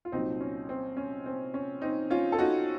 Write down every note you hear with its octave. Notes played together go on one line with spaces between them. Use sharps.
F4
C2 A#2 F#3 C4 D#4
C#4
C4
C#4
C4
C#4
C4 D#4
C#4 F4
A4
D#4 F#4